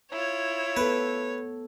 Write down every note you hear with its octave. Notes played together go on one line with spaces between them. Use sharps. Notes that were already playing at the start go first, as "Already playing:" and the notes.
E4 F4 C#5
B3 A4 B4